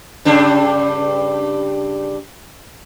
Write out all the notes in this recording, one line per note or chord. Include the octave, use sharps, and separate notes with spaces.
G2 C#3 D4